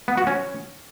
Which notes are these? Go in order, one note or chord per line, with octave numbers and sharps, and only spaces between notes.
B3
F#4
C#4